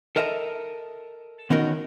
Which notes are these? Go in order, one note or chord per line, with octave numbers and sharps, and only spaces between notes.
A4 A#4 D#5 E5 F#5 A#5
D#3 B3 C#4 D#4 F#4 A#4